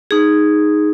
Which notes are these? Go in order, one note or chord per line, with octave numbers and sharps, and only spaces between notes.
D#4 G#4